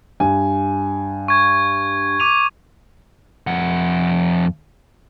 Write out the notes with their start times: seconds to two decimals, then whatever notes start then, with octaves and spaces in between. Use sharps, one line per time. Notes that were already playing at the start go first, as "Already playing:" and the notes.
0.20 G2 G#5
1.28 C#6 G#6
2.20 D6 D#7 F7
3.47 F2 F#5